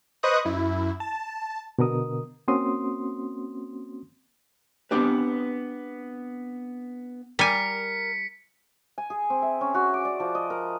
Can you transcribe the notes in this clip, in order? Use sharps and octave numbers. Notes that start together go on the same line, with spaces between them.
B4 C5 D#5 C#6 D#6 F#6
F#2 E4
A5
B2 D3 A#4 D#6
A#3 C4 C#4 F#4 C6 D#6
B3 C4 D4 G4 B4
G3 A#4 G#5 B6 C#7
G#5
G#4
C4
E5
C#4
F#4
D6
D5
F3
D#5
A#4